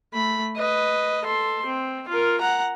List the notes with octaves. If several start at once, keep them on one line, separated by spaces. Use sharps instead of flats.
A3 B5
B4 D#5
A4 C6
C4
F4 A#4
F#5 A#5